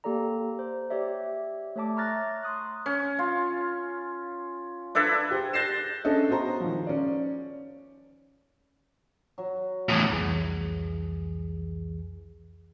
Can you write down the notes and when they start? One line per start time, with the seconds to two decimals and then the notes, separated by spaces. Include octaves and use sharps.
0.04 A#3 G4 A4 D5 A#5
0.59 C5
0.90 G4 C#5 D5 E5
1.76 A3 C#5 E5 A5 D6
1.97 A#5 C#6 F6 F#6 A6 A#6
2.43 C6 C#6 D#6 F#6
2.86 C#4
3.19 F4
4.95 D4 E4 A4 B4
5.31 G4 G#4 C5
5.53 F#6 G6 A6 A#6 C7 E7
6.04 C#4 D4 G#4 A4 D#5 E5
6.29 B3 F#4 G#4 C5 A#5
6.60 D#3 F3
6.87 C#4 D5
9.38 F#3
9.89 E2 A2
10.10 C2 F2 E3 G#4